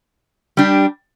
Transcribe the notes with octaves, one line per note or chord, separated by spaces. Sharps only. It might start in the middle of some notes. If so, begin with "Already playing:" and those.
G3 D4 G4